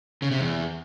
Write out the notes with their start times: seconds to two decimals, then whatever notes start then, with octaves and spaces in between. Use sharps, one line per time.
0.22 C#3
0.31 C3
0.40 E2